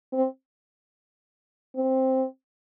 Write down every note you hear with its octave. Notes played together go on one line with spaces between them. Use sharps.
C4
C4